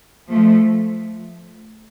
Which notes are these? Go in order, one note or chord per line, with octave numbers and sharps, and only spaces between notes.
F3 A3